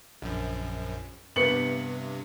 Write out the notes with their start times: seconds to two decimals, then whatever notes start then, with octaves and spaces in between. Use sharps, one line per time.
0.22 A#1 F#2
1.36 G2 C3 B3 C#7 F#7